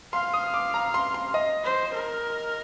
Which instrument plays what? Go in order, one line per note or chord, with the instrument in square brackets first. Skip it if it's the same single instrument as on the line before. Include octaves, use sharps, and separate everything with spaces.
[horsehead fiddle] F5 [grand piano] C6
[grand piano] D#6
D6
A#5
C6
C6
D#5
[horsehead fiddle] C5
A#4